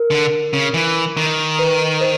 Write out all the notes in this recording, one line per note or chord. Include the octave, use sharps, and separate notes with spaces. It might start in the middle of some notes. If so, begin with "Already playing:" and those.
Already playing: A#4
D3
C#3
E3
D#3
B4
C5